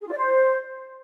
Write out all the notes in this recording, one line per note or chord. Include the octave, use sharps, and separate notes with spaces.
G#4
F4
D5
C5